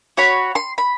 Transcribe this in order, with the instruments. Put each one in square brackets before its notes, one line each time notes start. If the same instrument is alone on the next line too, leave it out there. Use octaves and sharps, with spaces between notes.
[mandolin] F#4 C#5 B5
C6
B5